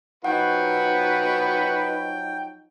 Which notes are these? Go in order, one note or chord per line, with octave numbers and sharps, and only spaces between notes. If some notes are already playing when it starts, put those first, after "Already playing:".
F3 F#3 D#4 F#4 B4 F#5 G5